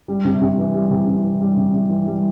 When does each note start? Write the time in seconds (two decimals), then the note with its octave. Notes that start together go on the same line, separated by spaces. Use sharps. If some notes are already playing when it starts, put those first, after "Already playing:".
0.08 G3
0.25 C3
0.41 C3
0.58 E3
0.74 G3
0.91 C3
1.07 C3
1.24 E3
1.41 G3
1.57 C3
1.73 C3
1.89 E3
2.07 G3